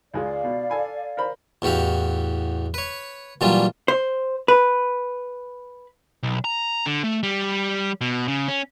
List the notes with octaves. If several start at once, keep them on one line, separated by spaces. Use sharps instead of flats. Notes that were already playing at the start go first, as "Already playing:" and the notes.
C#2 G#3 D5 F5
B2
A4 G#5 B5
A#4 C5 B5
E2 A2 F#4 G4 F5
B4 C#5
A#2 E3 F#3 G3 D4 F4
C5
B4
B1
A#5
D3
A3
G3
B2
C#3
C#4